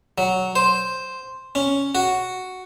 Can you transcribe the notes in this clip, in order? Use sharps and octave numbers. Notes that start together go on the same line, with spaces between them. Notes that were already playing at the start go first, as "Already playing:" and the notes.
F#3
C5
C#4
F#4